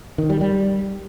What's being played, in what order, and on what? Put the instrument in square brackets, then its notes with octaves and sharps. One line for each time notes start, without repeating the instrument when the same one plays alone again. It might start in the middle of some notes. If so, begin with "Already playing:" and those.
[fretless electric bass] D#3
G3
G3